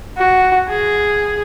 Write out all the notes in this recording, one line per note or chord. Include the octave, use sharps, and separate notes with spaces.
F#4
G#4